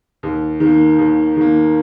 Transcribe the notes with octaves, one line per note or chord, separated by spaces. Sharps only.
D#2
D#3
A#3
D#2
D#3 A#3